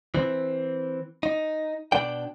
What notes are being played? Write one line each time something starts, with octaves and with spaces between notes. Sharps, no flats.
E3 C4
D#4
B2 D4 D5 G5